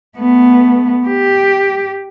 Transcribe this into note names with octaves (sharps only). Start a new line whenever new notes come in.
A3 B3
G4